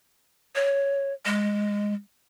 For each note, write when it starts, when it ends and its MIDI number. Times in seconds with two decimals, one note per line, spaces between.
0.55 1.13 73
1.26 1.93 56